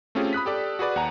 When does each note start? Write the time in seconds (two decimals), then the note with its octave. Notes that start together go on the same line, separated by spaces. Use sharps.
0.15 A3 C4 C#4 F4 G4 G#4
0.33 B5 D#6 F#6 B6
0.46 G4 A4 D5
0.79 F#4 G#4 B4 D5
0.96 D#2 F#5 G#5 A#5